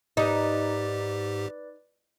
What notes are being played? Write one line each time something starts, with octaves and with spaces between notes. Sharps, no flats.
G#2 D#4 G4 B4 D5